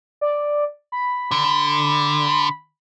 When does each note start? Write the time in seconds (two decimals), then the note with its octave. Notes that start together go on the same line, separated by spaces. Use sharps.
0.21 D5
0.92 B5
1.31 D3